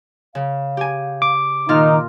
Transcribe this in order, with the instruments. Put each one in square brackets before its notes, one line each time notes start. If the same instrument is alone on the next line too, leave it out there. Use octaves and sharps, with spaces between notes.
[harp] C#3 [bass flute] F5
[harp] G4 G#5
[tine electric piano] D6
[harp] A#2 F4 F6 [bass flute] D#3 [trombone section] D#4